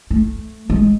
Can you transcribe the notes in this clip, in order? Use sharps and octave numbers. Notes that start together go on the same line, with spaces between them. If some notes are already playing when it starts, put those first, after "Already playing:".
A3
G#3